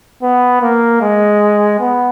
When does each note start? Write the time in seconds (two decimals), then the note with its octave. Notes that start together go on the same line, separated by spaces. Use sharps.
0.23 B3
0.61 A#3
1.01 G#3
1.80 B3